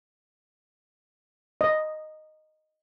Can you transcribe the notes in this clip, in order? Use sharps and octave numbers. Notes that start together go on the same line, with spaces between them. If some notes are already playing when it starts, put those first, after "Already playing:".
D#5